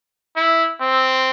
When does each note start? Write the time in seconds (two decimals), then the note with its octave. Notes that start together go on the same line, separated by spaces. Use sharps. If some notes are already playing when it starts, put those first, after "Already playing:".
0.36 E4
0.81 C4